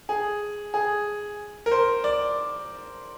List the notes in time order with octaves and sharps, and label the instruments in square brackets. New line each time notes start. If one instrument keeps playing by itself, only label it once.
[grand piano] G#4
G#4
A#4
C5
D5